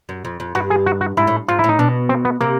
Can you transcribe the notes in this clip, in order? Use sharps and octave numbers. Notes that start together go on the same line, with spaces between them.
F#2
F2
F2
G2 F#4
G#4
F#4
F#4
G#2 E4
A2
G#2 F4
A2 E4
D#4
B2 D4
C4
B3
C3 A#3